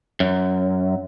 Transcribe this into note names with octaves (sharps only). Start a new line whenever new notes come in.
F#2